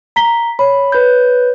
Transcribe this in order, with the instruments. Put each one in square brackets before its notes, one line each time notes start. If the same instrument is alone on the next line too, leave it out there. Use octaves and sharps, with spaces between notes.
[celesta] A#5 B6 G7
[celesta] C#5 [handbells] B5
[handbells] B4 G6